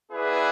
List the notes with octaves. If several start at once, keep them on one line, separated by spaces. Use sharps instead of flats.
B3 E4 G#4 B4 D5